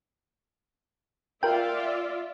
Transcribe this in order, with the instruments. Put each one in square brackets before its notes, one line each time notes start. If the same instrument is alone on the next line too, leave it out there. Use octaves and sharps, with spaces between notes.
[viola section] F4 D5 E5 [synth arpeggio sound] A#4 G5